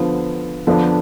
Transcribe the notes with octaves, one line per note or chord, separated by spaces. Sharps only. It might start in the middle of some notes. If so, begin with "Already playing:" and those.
Already playing: D3 F3 B3 F4 C5
F2 D3 F3 B3 D4